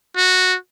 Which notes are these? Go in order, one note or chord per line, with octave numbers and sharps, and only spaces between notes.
F#4